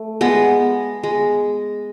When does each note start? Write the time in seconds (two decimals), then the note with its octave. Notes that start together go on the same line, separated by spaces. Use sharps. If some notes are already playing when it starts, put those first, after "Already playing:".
Already playing: A3
0.21 G#3 B3
1.03 G#3